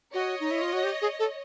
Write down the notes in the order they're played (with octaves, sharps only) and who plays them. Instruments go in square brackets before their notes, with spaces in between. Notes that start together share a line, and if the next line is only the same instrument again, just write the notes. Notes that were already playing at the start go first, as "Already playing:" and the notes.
[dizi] F#4 [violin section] C#5 D#5
[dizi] D#4
E4
F4
F#4
G4
G#4
A4